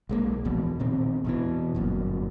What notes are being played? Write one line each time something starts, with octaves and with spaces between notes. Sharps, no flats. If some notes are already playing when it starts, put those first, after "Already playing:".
B1 G#3 A#3
A#1 E2 B2
A#2 D#3 B3 C4
E2 B2 E3
G1 F#2 A#2